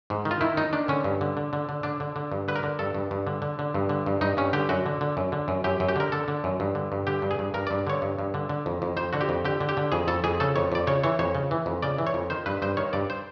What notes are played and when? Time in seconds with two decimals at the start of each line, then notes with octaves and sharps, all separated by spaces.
0.10 G#2
0.25 D#3
0.31 F4
0.41 D#3 E4
0.57 D#3 D#4
0.73 D#3 D4
0.88 D3 C#4
1.04 G2
1.21 D3
1.37 D3
1.53 D3
1.69 D3
1.83 D3 D4
2.00 D3
2.16 D3
2.32 G2
2.48 D3 B4
2.56 A#4
2.63 D3
2.79 G2 A4
2.94 G2
3.11 G2
3.27 D3
3.42 D3
3.59 D3
3.74 G2
3.89 D3
4.06 G2
4.21 G2 D#4
4.37 G2 C#4
4.53 D3 G4
4.69 F#2 F#4
4.86 D3
5.01 D3
5.17 F#2
5.32 D3
5.48 F#2
5.64 F#2 G4
5.80 F#2
5.88 G4
5.96 D3 A#4
6.12 D3 A4
6.28 D3
6.44 F#2
6.60 G2
6.75 D3
6.92 G2
7.07 D3 G4
7.22 G2
7.31 G#4
7.39 G2
7.54 G2 A#4
7.67 G2 D5
7.87 D3 C#5
8.02 G2
8.19 G2
8.34 D3
8.49 D3
8.66 F2
8.82 F2
8.97 F2 C5
9.13 D3 F#4
9.21 G4
9.29 F2
9.45 D3 G4
9.60 D3
9.69 G4
9.77 D3
9.92 F2 G#4
10.07 F2 A4
10.24 F2 G#4
10.40 C#3 A4
10.56 F2 C#5
10.72 F2 D5
10.87 C#3 C#5
11.04 E3 C#5
11.19 F2 C#5
11.35 C#3
11.51 E3
11.66 F2
11.82 C#3 D5
11.98 E3
12.07 C#5
12.14 F2
12.30 D#3 C5
12.46 G2 B4
12.62 G2 C5
12.77 D#3 C#5
12.93 G2 D5
13.10 C5